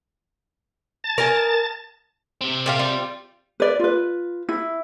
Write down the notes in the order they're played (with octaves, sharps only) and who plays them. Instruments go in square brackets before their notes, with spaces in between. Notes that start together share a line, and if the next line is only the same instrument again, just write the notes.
[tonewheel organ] A5 A6
[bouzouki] A#4 D#5 G#5
[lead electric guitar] C3 C4
[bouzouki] A#2 G4 F5
G3 F4
[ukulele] B4 D5
F4 B4
E4